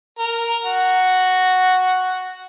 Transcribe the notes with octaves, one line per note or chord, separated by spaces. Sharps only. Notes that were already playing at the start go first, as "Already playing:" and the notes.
A#4
F#4